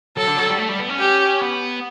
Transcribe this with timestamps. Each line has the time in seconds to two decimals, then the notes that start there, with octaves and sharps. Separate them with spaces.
0.17 F#3 A4
0.27 D3
0.38 F#3
0.48 G3
0.58 A3
0.69 G3
0.79 B3
0.89 C#4
0.99 G4
1.41 B3